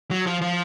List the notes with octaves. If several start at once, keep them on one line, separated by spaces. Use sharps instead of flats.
F#3
F3
F3